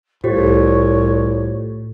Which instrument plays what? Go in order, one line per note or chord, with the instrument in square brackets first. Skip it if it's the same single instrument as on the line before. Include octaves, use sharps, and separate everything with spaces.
[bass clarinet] C2 [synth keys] A2 [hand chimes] F4 G4 C5 [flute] C#5